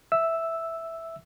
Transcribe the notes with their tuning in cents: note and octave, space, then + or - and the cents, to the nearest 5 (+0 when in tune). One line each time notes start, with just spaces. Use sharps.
E5 +0 E6 +0